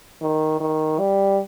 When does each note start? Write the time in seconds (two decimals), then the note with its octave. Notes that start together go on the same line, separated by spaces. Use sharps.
0.21 D#3
0.60 D#3
0.99 G3